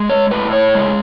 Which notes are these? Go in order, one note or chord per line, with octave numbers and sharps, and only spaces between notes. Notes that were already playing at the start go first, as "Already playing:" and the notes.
Already playing: G#3
C#5
A2 B4
C#5
G#3